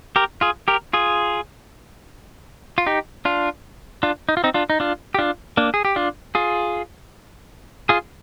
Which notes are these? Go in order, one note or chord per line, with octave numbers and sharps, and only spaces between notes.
G4 A#4
F4 G#4
G4 A#4
F4 G#4
F4
D#4 G4
D4 F4
D4 F4
D#4
F4
C4 D#4
D4 F4
D#4
D4 F4
G4
D4 F4
A#3 D4
G#4
G4
D4 F4
F4 G#4
F4 G#4